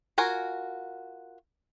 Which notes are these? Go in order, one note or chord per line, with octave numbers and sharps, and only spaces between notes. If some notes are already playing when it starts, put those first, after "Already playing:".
F4 F#4 A#4 G#5